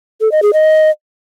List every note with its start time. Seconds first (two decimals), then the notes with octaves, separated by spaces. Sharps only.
0.21 A4
0.32 D#5
0.42 G#4
0.53 D#5